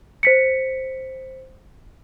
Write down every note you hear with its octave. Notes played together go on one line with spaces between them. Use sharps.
C5 B6 C#7